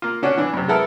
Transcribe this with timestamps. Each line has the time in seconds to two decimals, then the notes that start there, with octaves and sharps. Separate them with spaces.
0.02 A#3 F4
0.22 D3 C#4 D4 F#4
0.38 E3 D4
0.53 F#2 C3
0.68 G#3 B3 E4 A4 A#4